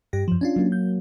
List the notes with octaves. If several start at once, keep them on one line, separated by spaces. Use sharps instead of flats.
G2 G4 A#6
F#2 F3
C#4 D4 F4
F#3 A#3
G6